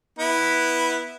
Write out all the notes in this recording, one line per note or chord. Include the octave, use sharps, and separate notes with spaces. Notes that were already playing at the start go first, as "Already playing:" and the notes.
B3 E4